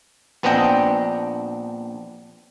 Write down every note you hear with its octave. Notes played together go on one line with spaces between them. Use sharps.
A#1 B3 C4 D4 D#5 G5